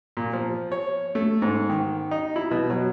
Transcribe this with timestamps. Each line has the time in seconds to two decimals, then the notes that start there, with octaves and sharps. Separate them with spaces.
0.17 A#2
0.33 F3
0.72 C#5
1.15 A3
1.42 G#2
1.70 D#3
2.11 D#4
2.36 E4
2.51 B2
2.70 F#3